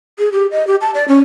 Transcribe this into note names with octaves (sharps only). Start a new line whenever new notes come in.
G#4
G4
D#5
G4
A5
D5
C#4